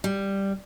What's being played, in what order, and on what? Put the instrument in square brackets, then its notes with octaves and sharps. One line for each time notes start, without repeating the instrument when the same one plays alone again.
[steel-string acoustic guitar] G3